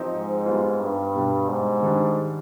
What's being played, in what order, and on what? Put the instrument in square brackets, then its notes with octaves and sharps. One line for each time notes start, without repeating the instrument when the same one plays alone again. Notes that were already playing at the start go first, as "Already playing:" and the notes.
Already playing: [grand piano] F3 C4 D#4 G4
[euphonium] G#2
[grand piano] G3 B3 F4
[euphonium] G2
[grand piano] B2 G3 D4 G4
[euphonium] G#2
[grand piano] D#3 G3 D4